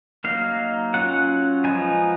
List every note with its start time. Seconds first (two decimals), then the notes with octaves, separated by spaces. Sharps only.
0.24 F#3 A#3 D#4 F5
0.94 F#3 C#4 F4 F#5
1.64 F3 G#3 B3 D#4 G#5